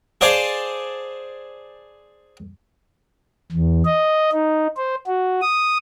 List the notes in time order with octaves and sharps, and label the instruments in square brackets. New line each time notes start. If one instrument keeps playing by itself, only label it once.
[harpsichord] G#4 C5 D5 F5 G#5 A5
[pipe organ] E2
D#5
D#4
C5
F#4
D#6